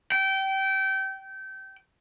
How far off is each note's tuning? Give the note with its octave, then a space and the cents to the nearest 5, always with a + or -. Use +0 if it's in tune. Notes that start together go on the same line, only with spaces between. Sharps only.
G5 -25